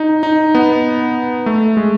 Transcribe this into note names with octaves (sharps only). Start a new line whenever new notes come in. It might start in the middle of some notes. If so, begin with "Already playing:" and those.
Already playing: D#4
D#4
B3
A3
G#3